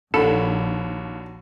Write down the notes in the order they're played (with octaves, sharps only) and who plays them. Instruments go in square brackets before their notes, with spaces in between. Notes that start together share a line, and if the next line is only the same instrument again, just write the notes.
[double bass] A#1 [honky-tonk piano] D#2 B5 [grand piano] D4 F#4 [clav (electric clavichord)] A4